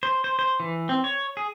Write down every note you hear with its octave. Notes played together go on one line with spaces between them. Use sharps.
C5
C5
C5
E3
C4
C#5
G#4